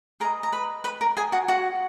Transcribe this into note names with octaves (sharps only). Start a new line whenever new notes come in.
G#4 A#4 B4 D#5 A#5
A#5
B4 B5
B4 B5
A#4 A#5
G#4 G#5
F#4 F#5
F#4 F#5